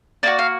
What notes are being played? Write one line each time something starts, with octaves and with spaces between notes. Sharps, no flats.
A#3 D4 F#4 D5
F5